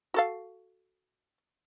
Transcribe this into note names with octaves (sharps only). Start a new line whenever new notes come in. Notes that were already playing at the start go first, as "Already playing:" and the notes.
F#4 A4 F5